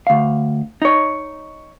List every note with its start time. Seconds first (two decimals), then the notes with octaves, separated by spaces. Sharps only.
0.07 D2 F5
0.82 D#4 C#5